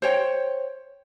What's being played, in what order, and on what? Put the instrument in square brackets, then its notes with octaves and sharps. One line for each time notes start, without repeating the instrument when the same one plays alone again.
[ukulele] C5 C#5 G5